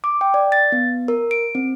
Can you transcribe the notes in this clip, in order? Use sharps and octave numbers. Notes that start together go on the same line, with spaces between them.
D6
G5
D5
A6
B3
A#4
D7
C4